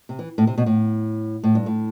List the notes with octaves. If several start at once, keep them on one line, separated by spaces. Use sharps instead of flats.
C3
E3
A2
C3
B2
A2
A2
G2
A2